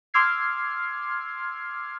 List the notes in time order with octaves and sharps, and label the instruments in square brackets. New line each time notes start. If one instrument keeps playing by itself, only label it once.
[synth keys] C6 D6 E6 F6 G#6 C7